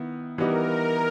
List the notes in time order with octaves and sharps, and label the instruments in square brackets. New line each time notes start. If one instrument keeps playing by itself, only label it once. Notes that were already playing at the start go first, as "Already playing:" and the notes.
Already playing: [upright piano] D#3 B3 E4
[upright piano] E3 G3 B3 D#4 G4 [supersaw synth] A#4